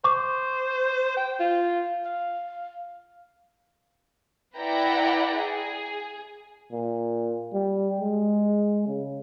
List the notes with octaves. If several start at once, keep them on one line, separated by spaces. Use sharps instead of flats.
C5 C#6 D6
G5
F4
F5
E4 B4 D5 F#5 G5 A#5
G#4
A#2
G3
G#3
C#3